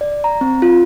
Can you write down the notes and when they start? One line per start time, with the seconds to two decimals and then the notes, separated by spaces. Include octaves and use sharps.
0.01 D5
0.24 A#5
0.41 C4
0.62 F4